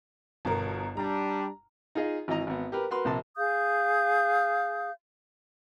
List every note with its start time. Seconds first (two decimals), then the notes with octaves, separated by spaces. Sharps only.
0.45 G1 B2 A#4
0.97 G3 D4 A#5
1.95 D#4 F4 G#4 D#5
2.28 G#1 E3 D#5 A#5
2.47 G#1 B3
2.72 G4 A#4 B4
2.91 F#4 A#4 B4 C6
3.05 A#1 C3 A5
3.36 G#4 F5 D#6 G6